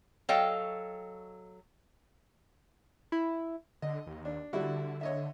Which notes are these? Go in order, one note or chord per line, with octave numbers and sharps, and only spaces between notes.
F#3 A4 D#5 F5 G5
E4
D3 D#5
D#2
D4
D3 G3 E4 F#4
C#5 D#5 E5